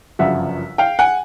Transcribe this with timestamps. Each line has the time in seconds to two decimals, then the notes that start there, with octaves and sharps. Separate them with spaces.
0.19 G1 F#2 C#3 F3 E5 F#5
0.78 F5 G5
0.99 F#5 G#5